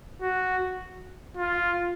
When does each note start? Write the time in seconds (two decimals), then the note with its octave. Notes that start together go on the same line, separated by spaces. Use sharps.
0.22 F#4
1.37 F4